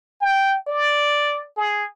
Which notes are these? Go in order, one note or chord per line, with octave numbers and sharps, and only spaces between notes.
G5
D5
G#4